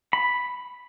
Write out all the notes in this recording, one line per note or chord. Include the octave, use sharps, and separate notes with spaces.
B5